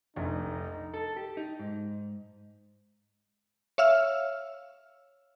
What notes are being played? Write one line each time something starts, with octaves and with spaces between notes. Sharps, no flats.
F1 A#1 D#4
A4
G4
D#4
G#2
C#5 E5 F5 E6 F6